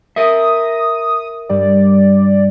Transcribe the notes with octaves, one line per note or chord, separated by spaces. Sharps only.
A#4 E5 D#6
G2 G3 D5